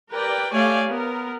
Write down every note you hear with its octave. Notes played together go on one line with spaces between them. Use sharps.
G4 A#4 B4 D5 G5
A3 G4 C#5 D5 F5 G#5
B3 A#4